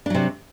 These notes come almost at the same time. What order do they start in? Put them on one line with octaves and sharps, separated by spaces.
D4 F#3 C3